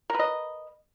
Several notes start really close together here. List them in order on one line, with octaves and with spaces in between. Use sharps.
A#4 B4 D#5